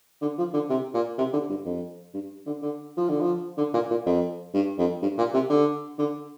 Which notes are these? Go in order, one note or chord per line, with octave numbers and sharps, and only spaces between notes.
D3
F3
D3
C3
A#2
C3
D3
G2
F2
G2
D3
D3
F3
D3
F3
D3
A#2
A#2
F2
G2
F2
G2
A#2
C3
D3
D3